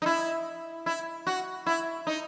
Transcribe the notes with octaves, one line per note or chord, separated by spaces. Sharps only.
D#4
E4
E4
F#4
E4
D#4